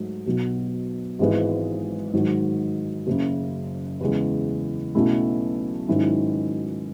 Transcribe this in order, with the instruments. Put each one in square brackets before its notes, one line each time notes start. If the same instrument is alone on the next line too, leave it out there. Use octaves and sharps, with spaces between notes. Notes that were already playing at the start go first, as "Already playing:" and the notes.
Already playing: [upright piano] G#2 F#3 A3
B1 B2 F#3
G#1 G#2 E3 G#3 B3
G#2 D#3 F#3
F#1 F#2 C#3
E2 C#3 G#3
B1 B2 A3 C#4 E4
G#2 D#3 F#3 C#4 E4